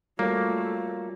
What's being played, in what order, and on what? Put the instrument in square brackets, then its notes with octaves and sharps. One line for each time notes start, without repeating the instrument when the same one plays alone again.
[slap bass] G3 [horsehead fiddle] A3 [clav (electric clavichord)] A#3 [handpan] F4 F#4 C#5